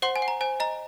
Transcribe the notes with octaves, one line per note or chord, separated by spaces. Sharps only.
C5 F#5 C6
G#5
F#5
A#5
C5 G#5
D#5 A#5